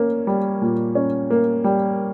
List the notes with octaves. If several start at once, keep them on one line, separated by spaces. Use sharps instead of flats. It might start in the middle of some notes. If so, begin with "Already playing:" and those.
Already playing: A#3 C#4
G3
A#2
C#4
A#3
G3